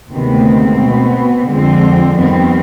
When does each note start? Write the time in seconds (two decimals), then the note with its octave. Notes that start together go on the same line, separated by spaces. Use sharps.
0.11 D2 C3 D#3 G#3 B3 C4
0.80 B2 B3
1.49 F2 D3 F3 G#3 C4
2.16 F2 D#3 G3 B3 C4